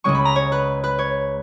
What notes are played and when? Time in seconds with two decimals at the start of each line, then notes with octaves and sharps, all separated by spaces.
0.04 C#2 C#3 G#3 C#4 C#6
0.15 B5
0.25 A#5
0.36 C#5
0.52 B4
0.84 B4
0.99 C#5